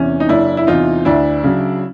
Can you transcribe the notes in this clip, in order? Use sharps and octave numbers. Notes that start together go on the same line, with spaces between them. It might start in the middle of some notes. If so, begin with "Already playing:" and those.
Already playing: E2 C3 C#4
D#4
F#1 D4 E4
E4
E2 C3 D#4 F4
D2 D4 E4
C#3 F#3